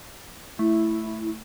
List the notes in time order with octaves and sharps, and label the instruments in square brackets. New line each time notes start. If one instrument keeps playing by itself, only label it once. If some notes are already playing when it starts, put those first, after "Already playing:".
[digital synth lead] A3 [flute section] E4